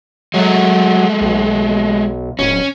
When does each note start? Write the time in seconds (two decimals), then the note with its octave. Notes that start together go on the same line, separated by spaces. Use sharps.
0.34 F#3 G#3 A3
1.21 B1
2.39 D1 C#4